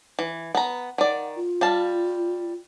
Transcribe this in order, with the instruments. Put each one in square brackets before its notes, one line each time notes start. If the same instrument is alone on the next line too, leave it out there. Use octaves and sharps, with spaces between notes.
[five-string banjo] E3
B3 A#5
[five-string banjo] D#3 D5 [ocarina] F#5
[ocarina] F4
[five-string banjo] G3 F5 A5